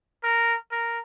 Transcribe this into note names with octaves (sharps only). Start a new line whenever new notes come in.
A#4
A#4